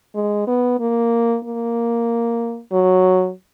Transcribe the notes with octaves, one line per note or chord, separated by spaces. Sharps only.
G#3
B3
A#3
A#3
F#3